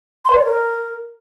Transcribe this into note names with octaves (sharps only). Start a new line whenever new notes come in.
C6
B4
D5
C#5
A#4